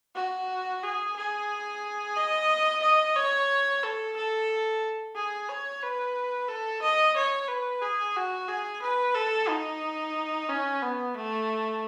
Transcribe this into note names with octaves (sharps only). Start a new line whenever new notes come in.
F#4
G#4
G#4
D#5
D#5
C#5
A4
A4
G#4
C#5
B4
A4
D#5
C#5
B4
G#4
F#4
G#4
B4
A4
D#4
C#4
B3
A3